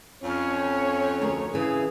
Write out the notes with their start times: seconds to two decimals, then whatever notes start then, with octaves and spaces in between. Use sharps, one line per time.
0.24 F2 C#4 C#5
1.22 D2 G#4 A#4
1.54 C#3 E3 G#4